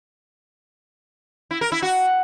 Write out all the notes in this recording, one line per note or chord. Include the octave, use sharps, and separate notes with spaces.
E4
A#4
E4
F#4